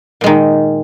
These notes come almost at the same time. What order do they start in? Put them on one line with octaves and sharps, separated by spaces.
A#2 G#3 D#3